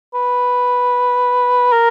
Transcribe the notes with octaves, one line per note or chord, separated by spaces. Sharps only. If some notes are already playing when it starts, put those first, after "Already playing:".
B4
A#4